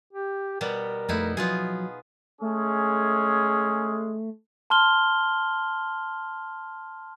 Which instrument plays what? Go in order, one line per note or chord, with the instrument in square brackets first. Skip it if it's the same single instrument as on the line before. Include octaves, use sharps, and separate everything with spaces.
[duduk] G4
[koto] B2 G3 B3 [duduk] A#4
[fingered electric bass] F2 A3 [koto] B3 D#4 E4
[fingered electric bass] F3 F#3 [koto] B3 F4 G#4
[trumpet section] G#3 C#4 G#4 [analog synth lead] A3
[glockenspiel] A5 C6 F6 G7